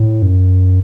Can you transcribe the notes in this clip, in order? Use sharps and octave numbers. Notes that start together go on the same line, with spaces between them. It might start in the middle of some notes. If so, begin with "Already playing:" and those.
Already playing: A2
F#2